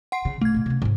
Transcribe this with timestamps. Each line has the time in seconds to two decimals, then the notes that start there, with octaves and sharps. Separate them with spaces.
0.12 F#5 C6 C7
0.25 C#3
0.41 F#1 B2 A3 G#6
0.54 A#2 G#3
0.66 C3 C#4
0.82 G#2 C#3